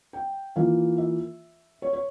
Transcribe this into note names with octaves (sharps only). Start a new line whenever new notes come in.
G5
E3 A#3 F4 F5
E5
C#5
C#5